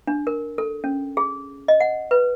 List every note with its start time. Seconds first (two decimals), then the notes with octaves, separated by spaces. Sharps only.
0.07 D4
0.27 A#4
0.58 A4
0.84 C#4
1.17 G#4
1.68 D#5
1.81 F#5
2.11 B4